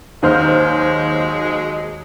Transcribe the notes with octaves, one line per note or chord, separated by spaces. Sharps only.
D#2 F#3 G#3 C5 F6